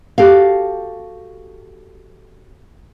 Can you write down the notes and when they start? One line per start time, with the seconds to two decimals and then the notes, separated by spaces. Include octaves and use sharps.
0.18 F#4 G4 A4 F5